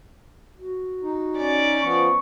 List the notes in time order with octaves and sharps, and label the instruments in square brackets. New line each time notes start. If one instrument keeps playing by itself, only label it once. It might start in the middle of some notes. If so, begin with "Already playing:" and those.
[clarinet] F#4
[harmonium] D#4
[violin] C#4 D5
[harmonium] F3 B3 [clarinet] C#6